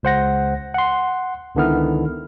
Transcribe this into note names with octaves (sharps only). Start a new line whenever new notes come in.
C#2 C5 F#5 A#6
F#5 C6
C#2 D3 D#3 B3 E4 F6